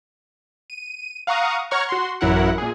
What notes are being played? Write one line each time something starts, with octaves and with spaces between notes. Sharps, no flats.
D#7
F5 F#5 A#5 C#6 D#6
C#5 F#5 A#5 C#6 F6 G#6
F#4 C6
A1 F#2 F#3 E4 A#4 F#5
A#2 G#4